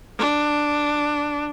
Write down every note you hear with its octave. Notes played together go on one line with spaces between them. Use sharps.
D4